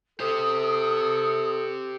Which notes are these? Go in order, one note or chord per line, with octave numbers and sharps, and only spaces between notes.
G4 A4 C5 D#6